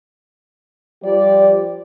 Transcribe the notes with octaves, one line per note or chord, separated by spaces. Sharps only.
F3 G3 G4 D5